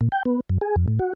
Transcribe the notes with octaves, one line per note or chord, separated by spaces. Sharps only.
A#2
G5
B3
F#2
G#4
F2
A2
F#4